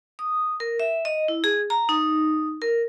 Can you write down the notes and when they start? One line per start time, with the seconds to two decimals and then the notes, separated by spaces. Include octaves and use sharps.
0.19 D#6
0.60 A#4
0.80 E5
1.05 D#5
1.28 E4
1.44 G#4
1.70 A#5
1.89 D#4
2.62 A#4